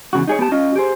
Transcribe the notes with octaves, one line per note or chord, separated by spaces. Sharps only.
E2 C#3 F#4
D#4 G#4 C#5
B3 G4 A5
C#4 F4 D#5
G4 G#4 C5